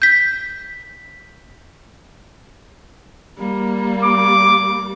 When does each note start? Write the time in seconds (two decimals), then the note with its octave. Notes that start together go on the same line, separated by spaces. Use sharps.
0.02 G6 B6
3.38 G3 A#3
4.04 D6